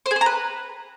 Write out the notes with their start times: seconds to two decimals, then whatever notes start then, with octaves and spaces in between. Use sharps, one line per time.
0.06 C5
0.11 G#4
0.16 C5
0.21 A#5
0.26 B4